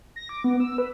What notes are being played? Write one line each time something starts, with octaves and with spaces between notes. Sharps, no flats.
A#6
D6
B3
E6
B4